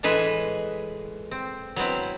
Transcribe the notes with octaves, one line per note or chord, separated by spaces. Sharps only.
A2 E3 G#3 G#4 B4 E5
C4
F#3 B3 C4 E4